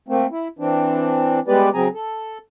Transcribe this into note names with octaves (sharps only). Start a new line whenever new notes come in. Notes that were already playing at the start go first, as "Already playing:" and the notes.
A3 A#3 C4
E4
E3 C4 D4
G3 G#3 B3 G4 B4 D5
C#3 F#3 C4 G#4 G#5 A#5
A4